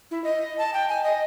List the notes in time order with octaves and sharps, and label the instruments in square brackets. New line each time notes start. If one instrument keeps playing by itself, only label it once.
[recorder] E4
D#5
A5
G5
G#5
D#5